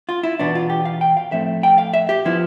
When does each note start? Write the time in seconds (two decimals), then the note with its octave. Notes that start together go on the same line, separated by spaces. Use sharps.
0.09 F4
0.23 E4
0.39 E2 B2 B3 D4
0.55 F4
0.70 G4
0.85 F5
1.01 G5
1.17 F5
1.32 A2 F3 A3 C4 E5
1.63 G5
1.78 F5
1.94 E5
2.09 G4
2.25 F3 B3 E4